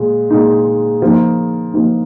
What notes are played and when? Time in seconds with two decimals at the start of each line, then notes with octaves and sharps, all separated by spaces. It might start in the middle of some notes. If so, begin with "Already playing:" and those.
Already playing: A#2 G#3
0.30 A#2 G#3 D#4
1.02 F3 A#3 D#4
1.74 F3 A#3 D#4